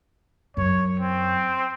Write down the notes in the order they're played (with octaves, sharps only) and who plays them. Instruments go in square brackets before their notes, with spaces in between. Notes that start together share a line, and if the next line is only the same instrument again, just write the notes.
[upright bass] F#2 [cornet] C#5
[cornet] C4